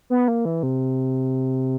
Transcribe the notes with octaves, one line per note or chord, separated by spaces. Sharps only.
B3
A#3
E3
C3